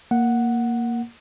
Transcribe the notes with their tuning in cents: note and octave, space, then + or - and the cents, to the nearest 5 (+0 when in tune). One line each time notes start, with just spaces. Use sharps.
A#3 +0 F#5 +0